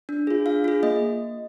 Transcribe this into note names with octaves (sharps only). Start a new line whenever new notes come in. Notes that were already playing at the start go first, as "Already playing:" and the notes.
D4
F4 G#4
D4 F5
F4 G#4
A#3 D#5